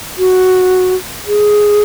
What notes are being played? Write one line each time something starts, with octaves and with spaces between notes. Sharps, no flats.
F#4
G#4